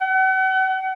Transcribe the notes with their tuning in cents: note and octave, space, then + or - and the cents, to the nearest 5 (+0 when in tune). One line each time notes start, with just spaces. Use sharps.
F#5 +40